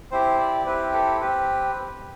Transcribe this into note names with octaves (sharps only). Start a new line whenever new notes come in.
C4 E4 G4 C5
D5
C4 E4 G4 B4
A4
C4 G4 B4